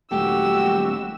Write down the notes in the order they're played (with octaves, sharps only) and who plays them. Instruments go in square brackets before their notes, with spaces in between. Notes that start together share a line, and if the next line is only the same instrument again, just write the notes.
[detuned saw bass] D#1 [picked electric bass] F#3 G#3 A3 [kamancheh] F#4 E6 [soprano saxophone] G4